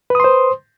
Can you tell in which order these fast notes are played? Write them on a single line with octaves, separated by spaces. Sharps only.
B4 D#6 C6 C5